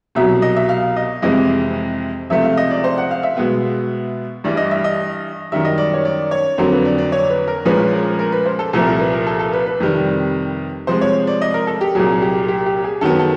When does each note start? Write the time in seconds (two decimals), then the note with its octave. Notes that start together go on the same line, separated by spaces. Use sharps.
0.15 C2 B2 F#3 E5
0.42 D#5
0.56 E5
0.69 F5
0.96 D#5
1.22 F2 C3 E3 G#3 D#5
2.30 C#2 C3 F3 A3 E5
2.44 F5
2.57 D#5
2.71 D5
2.84 C5
2.98 F#5
3.11 F5
3.23 E5
3.37 B2 G#3 B3
4.44 G2 E3 G3 D5
4.57 D#5
4.71 E5
4.84 D#5
5.52 F#2 D#3 G3 E5
5.65 D#5
5.78 D5
5.94 C#5
6.05 D5
6.31 C#5
6.58 F2 D3 F#3 A#3 C5
6.72 B4
6.85 D5
6.98 D5
7.12 C#5
7.30 B4
7.48 A#4
7.65 A#2 F3 G#3 C#4 B4
7.93 A#4
8.19 A#4
8.32 B4
8.46 C5
8.59 A4
8.73 C2 A#2 F3 A3 A4
8.87 A#4
9.00 B4
9.13 A#4
9.27 A4
9.39 A4
9.53 B4
9.67 B4
9.80 F2 C3 D#3 G3
10.87 C3 F3 G#3 C5
11.01 C#5
11.27 D5
11.41 D#5
11.54 A#4
11.67 A4
11.81 G4
11.95 C2 A#2 F#3 G#4
12.22 G4
12.48 G4
12.66 G4
12.84 G#4
13.01 F#2 D#3 F#3 B3 A4
13.19 A4